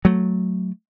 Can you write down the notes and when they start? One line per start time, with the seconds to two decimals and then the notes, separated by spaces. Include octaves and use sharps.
0.05 F#3 A3